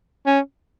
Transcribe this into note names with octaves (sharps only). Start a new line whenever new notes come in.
C#4